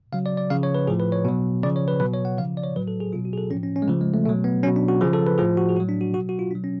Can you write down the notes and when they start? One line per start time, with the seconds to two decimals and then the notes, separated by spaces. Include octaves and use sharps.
0.12 C#3 F#3 F5
0.26 D5
0.37 D5
0.50 C#3 F3 F5
0.63 C#5
0.75 B4
0.88 A2 F3 G#4
1.00 B4
1.12 C#5
1.25 B2 F#3
1.63 C#3 F3 D5
1.76 C#5
1.88 B4
2.00 B2 F#3 B4
2.13 C#5
2.25 F#5
2.38 C#3 F3 F5
2.57 D5
2.64 C#5
2.76 A2 F#3 B4
2.88 A4
3.00 G#4
3.12 B2 F#3 F4
3.25 F#4
3.33 G#4
3.38 A4
3.51 A2 F3 C#4
3.63 C#4
3.76 C#4
3.82 G#3
3.88 C#3 F3 A3
4.01 G#3
4.14 A3
4.25 B2 A3
4.29 F#3
4.44 B3
4.63 B2 F#3 C#4
4.76 D4
4.88 F#4
5.01 F3 G#4
5.04 C#3
5.13 A4
5.27 B4
5.38 A2 F3 G#4
5.57 F#4
5.69 G#4
5.76 A2 F#4
5.80 F#3
5.89 D4
6.01 F#4
6.13 B2 F#3 F#4
6.29 F#4
6.39 F4
6.51 B2 F#3 D4
6.64 C#4